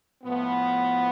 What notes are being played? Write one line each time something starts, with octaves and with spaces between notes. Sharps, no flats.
A2 F3 B3